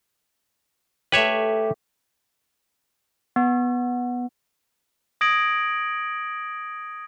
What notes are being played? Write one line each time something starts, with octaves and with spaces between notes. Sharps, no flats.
A3 G4 B4 C#5 E5
B3
D#6 G#6 A#6 D7 F#7